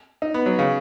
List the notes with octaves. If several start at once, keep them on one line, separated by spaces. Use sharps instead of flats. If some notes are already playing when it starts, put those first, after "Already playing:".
D#4
B3
F#3
C#3